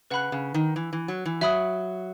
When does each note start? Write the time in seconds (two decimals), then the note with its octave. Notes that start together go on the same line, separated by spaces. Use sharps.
0.10 C#3 B4 F#5 B5 F#6
0.32 C#3
0.54 D#3
0.76 E3
0.93 E3
1.08 F#3
1.25 E3
1.41 F#3 E5 B5 D#6 F#6